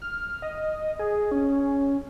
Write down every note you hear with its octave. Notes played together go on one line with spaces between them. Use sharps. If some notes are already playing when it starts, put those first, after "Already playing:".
F6
D#5
G#4
C#4